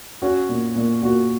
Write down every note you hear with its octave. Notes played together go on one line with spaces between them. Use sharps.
C#4 F#4
A#2
A#2
A#2 F#4